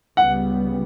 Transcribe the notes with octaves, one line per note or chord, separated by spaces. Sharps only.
C#2 C#3 G3 B3 F#5